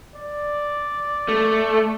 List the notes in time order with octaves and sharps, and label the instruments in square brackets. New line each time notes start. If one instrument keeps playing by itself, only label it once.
[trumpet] D5
[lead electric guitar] A3